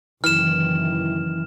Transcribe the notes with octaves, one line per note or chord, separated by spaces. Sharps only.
F#1 D#3 E3 F6 E7